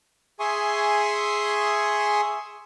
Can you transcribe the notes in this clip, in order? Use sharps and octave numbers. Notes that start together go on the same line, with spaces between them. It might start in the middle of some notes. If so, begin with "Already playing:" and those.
G#4 E5 G#5 C6 C#6 D#6